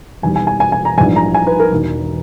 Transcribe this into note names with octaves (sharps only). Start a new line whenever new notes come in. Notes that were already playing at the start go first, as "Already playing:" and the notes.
E1 E2 D#3 G3 G#5
G#5
G#5
G#5
G#5
A#5
A#1 G#2 E3 G3 G#5
A#5
G#5
B4
A#4
E1 E2 D#3